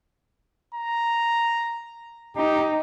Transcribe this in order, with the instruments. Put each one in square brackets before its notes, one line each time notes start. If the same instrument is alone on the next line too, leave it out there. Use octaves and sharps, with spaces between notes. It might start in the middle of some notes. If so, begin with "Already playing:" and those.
[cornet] A#5
[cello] D#4 [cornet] G4